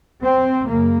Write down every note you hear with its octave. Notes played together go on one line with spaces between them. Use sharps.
C4
F#2 C#3 A#3